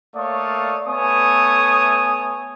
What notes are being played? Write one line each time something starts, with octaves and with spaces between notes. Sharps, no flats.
A3 A#3 C#5 D5 F5 D#6
A3 B3 C#5 G#5 D#6